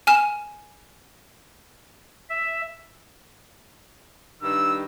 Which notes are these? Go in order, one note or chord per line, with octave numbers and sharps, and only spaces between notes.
G#5 F6 E7
E5
G2 D#3 G3 E6